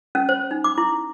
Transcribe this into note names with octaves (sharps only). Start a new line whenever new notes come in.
C#4
C5
D#4
D6
E4